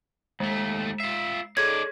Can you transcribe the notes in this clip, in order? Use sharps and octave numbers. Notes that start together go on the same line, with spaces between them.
D#2 G#3 A3
F4 E5 C7
D#4 G#4 A4 C#5 D5 G#6